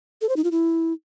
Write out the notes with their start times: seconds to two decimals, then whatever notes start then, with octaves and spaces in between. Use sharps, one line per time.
0.21 A4
0.29 C5
0.36 D#4
0.44 F4
0.52 E4